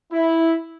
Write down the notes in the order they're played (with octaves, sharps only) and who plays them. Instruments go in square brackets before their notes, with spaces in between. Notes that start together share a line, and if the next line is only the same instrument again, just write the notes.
[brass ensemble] E4